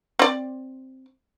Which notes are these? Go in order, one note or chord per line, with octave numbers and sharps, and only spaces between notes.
C4 D5